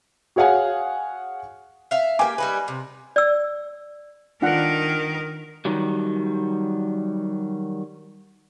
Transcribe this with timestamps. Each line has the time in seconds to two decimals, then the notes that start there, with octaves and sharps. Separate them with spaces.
0.36 F#4 G#4 C#5 F5 F#5 G#5
1.91 E5 F5
2.19 A#3 G4 G#5 D6
2.38 G3 D#4 B4
2.68 C3
3.16 D5 E6
4.42 D#3 D4 F4 A#4 F#5
5.65 D#3 F#3 G3